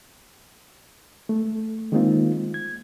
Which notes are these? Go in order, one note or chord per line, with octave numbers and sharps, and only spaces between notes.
A3
D#3 G#3 A#3 C4 D#4 F4
G#6